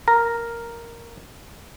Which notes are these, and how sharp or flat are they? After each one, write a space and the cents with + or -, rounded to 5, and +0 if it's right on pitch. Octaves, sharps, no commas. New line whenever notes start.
A#4 +0 A#5 -5